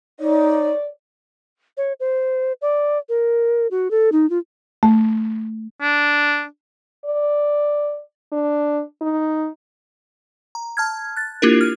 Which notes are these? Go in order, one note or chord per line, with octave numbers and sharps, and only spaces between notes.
D#4 C#5 D5
C#5
C5
D5
A#4
F#4
A4
D#4
F4
A3
D4
D5
D4
D#4
A#5
A5 F6 G#6
F#6 A6
A#3 D4 E4 F4 G4 A#4
F6